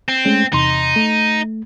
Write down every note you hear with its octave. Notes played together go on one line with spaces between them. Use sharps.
C4
G#3 A3 C#4
E2 C3 D#4 C6
A3